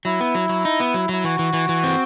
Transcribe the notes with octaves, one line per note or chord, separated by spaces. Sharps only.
F#3 E4
B3
F#3
F#3
D#4
B3
F#3
F#3 E4
E3 F#4
E3
E3
E3
C4